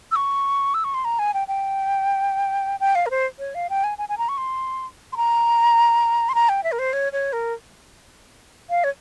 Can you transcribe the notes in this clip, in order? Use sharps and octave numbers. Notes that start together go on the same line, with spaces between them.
E6
C#6
E6
C#6
C6
A#5
G#5
G5
G5
G5
F5
A#4
C5
C#5
F5
G5
G#5
G#5
G#5
A#5
C#6
C6
C6
A#5
C6
A#5
G5
E5
A#4
C5
C#5
C#5
A#4
F5
C#5